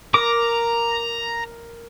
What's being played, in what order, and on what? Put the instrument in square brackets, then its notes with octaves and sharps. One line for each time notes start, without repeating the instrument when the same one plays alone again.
[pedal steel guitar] A#4 D6 [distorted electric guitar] A#5